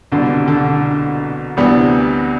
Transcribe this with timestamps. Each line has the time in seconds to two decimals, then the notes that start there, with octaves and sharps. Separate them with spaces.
0.12 C2 B2 D3 G3
0.48 D3
1.57 D2 C3 E3 G3 B3 D4